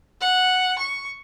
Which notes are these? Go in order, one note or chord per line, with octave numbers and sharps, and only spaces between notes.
F#5
C#6